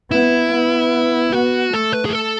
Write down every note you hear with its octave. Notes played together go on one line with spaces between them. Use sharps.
B3 E4
B3
B3 F#4
A3 A4
B4
G#4
A4